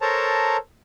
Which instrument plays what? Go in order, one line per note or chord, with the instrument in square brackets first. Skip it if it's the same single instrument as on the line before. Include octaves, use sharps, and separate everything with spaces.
[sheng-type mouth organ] A4 A#4 C5 C#5 A5 A#5